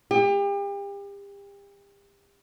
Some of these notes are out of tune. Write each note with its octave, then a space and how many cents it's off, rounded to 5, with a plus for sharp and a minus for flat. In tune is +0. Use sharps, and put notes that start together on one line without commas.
G4 +35